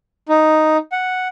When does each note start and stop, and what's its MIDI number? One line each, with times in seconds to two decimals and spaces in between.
0.29 0.77 63
0.92 1.28 78